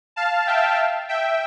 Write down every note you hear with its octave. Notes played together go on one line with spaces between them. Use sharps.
F5 A5
E5 G5
E5 G5